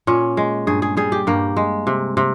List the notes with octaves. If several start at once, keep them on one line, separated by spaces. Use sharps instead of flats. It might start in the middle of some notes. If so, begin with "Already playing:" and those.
A#2 C#4
G#3
G2 G#4
G#4
G3 G#4
G4
G2 A#3
G#3
C3
C3